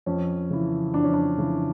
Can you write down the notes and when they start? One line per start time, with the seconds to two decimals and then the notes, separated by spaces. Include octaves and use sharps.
0.06 F2 C#4
0.50 C#3 E3
0.94 F2 D4
1.04 C#4
1.14 D4
1.38 C#3 E3